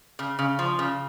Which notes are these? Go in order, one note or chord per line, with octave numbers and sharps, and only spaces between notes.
C#3
C#3
F3
C#3